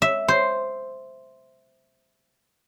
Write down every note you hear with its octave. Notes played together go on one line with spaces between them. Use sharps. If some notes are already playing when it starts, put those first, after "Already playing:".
E5
C5